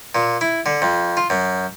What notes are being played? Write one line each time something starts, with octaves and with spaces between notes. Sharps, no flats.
A#2
E4
D3
F2
F4
F#2